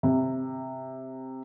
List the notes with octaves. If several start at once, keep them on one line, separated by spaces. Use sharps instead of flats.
C3